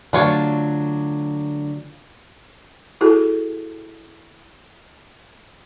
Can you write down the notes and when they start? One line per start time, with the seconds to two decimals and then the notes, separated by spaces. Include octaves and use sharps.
0.13 D3 F#3 A3 D4 F4 C#5
3.01 E4 F#4 G#4 A4